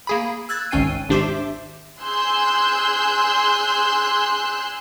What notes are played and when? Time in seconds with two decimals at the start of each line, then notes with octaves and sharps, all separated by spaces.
0.07 A#3 G#4 B5
0.49 E6 F#6 G#6 A6
0.71 G#1 C#2 C#4 G5 C7 D#7
1.09 G#1 D4 G4 C5 E5 D6
2.00 G#4 G#5 C6 E6 F#6 G6